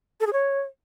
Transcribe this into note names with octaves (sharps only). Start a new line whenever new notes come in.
A4
G#4
C#5